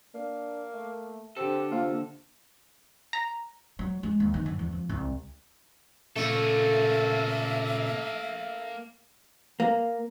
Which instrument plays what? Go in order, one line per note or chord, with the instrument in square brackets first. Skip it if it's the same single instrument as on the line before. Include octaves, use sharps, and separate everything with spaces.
[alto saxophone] A#3 [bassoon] D4
[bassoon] A3
[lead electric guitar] D3 A4 [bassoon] C4 [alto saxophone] G4
[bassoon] C3 [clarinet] A#3 [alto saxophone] F4
[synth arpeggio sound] A#5
[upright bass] F#3
G#3
D#2
D#3
F#2
E2
F2
C2
[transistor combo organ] A#2 C#3 [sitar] A3 [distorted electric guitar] A#3 A4 [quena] E5
[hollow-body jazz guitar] A#3